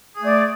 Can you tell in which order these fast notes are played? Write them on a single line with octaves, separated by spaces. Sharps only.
G#4 A3 D5